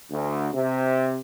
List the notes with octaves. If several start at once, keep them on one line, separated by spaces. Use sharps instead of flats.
D2
C3